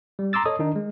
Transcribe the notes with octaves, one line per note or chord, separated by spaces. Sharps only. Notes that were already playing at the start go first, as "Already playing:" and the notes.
G3
A#5 C6 D6 E6 A6
A4 C#5 D#5 D#6
D#3 D4 D#4
G#3